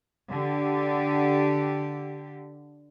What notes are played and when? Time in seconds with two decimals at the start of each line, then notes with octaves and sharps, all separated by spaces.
0.28 D3 G4